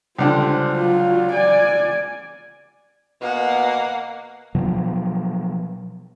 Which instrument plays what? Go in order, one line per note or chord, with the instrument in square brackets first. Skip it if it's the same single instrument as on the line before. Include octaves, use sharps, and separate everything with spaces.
[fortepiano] C#2 D3 G3 [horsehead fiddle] C5
[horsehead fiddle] F#3 F4
D5 G#5
[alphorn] B2 [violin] A#3 [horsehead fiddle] F#5
[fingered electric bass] B2 F3 F#3